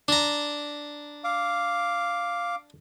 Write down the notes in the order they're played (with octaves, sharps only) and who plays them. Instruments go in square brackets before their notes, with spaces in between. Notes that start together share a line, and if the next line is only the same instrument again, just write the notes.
[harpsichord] D4 A#5
[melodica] F5 D6